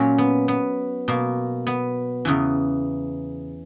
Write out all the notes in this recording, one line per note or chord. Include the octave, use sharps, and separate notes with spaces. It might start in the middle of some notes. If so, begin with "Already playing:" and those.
Already playing: A#2 F#3 A#3 C#4
B3
B3
B2 A#3
B3
E2 C#3 E3